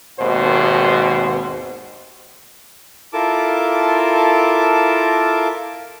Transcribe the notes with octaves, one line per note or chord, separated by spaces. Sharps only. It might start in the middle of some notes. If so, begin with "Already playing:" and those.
G#1 D#2 B2 C5
E4 F4 A4 A#4 A5 D6